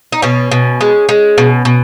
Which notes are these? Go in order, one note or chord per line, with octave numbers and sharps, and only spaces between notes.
D#4
B2 C#4
B2
G#3
G#3
B2
B2